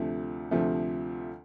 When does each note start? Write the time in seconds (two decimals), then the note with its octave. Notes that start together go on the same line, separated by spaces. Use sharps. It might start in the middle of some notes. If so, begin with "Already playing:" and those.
Already playing: D2 C3 F3 A3
0.51 D2 C3 F3 A3